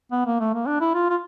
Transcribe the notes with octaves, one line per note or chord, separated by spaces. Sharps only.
B3
A#3
A3
A#3
D4
E4
F4
F4